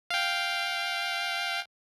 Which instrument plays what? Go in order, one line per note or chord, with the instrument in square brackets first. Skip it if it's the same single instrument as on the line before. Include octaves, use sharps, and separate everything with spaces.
[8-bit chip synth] F5 G5